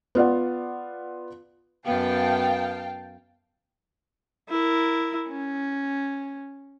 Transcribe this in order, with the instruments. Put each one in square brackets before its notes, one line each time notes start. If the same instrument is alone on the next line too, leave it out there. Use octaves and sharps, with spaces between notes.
[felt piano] B3 F4 D5 F#5
[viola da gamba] F#2 B3 [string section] F5 G5 A5
[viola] E4 A#4
C#4